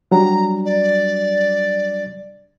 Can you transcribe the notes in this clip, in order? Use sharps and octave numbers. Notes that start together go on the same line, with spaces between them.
F#3 G3 D4 A#5
D5